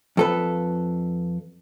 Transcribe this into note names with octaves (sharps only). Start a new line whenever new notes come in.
F2 A4 B4